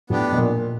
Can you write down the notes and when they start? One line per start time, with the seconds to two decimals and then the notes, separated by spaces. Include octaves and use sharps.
0.10 A2 B3 D4 G4
0.32 B2
0.38 A#2